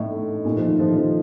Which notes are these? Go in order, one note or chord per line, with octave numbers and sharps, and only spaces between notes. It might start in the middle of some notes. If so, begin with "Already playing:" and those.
Already playing: A2 D#4 D#5
A4
D#4
A#2 D#4
F3
D#5
D#3
F3 A4
F3 D#4